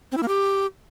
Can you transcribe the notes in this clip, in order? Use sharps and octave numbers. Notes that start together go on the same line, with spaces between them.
C4
E4
A#3
G4